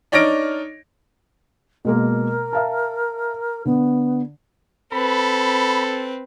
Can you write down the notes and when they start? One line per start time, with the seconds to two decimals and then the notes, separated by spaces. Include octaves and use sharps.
0.12 D4 D#4 C#5 F6 A#6 D7
1.85 B2 G#3 A#3 A#4
2.53 E5 F5 A5
3.65 D3 B3
4.92 C4 A4 B4 B5